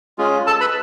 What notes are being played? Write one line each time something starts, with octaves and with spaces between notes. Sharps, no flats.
G#3 C#4 F4 G#4
A4 A5
B4 B5